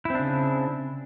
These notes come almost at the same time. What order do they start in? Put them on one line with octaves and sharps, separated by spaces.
E4 C4 D4 C#3